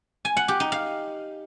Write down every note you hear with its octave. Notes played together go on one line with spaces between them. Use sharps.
G#5
F#5
G4
D#4
F5